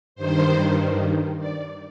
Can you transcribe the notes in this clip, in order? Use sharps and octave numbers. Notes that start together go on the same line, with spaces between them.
G2 D#3 C5
D5